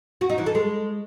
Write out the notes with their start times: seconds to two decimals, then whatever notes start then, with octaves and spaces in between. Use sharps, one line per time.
0.21 F#4
0.30 D#4
0.38 E3
0.46 A4
0.55 G#3